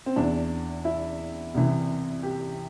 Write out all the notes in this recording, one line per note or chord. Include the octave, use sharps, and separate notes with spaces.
C4
E2 E3 D4
E4
C2 C3 E3
G4